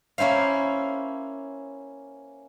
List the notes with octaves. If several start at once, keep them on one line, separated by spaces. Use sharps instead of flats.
A#3 C#4 E4 C5 F5